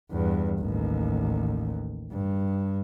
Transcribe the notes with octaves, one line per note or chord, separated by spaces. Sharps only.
E2 G2
A1 D#2
G2